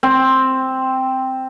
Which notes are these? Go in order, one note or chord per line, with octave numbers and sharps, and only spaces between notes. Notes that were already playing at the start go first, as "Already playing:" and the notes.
C4